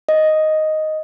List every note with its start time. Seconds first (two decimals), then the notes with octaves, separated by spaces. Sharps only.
0.09 D#5